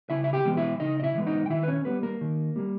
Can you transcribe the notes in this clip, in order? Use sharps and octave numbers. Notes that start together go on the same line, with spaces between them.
C#3 E4 E5
E5
G4 G5
E3 G#3 B3
E4 E5
C#3 D#4 D#5
D#5
E4 E5
E3 G#3 B3
D#4 D#5
G5
D#3 E4 E5
B4
C#4 C#5
G3 A#3 B3 B4
A#3 A#4
D#3
G3 A#3